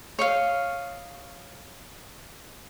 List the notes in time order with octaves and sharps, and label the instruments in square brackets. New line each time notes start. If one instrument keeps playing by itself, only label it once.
[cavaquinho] C#5 D#5 F5